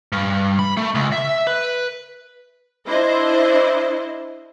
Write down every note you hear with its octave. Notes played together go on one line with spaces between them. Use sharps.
G2
B5
A3
C#2
E5
B4
D4 E4 C5 D#5